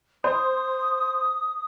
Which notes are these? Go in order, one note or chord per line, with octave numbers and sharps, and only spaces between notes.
C5 D#6